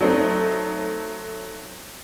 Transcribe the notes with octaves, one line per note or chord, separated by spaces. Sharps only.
F#3 A3 C4 D#4